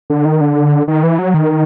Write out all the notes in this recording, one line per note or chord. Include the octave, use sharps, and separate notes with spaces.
D3
D#3
D3
D#3
E3
F#3
D#3